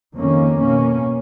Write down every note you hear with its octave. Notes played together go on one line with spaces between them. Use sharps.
F2 D#3 A#3 C#4
B2 A#3 C#4